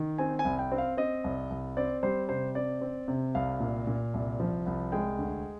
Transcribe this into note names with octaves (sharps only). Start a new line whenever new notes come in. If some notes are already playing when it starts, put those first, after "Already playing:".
Already playing: D#3
C4 G#5
G#5
C2
G5
C4
F5
C4 D#5
C2
C2
C4 D5
G3 C5
C3 C5
C4 D5
C4
C3
C2 F5
A#2
A#2
C2
F3
C2
G#3 G5
D2